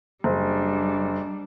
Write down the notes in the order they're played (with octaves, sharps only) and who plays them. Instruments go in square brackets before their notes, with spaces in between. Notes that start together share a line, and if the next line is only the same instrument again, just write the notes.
[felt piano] F#1 [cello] G3 D4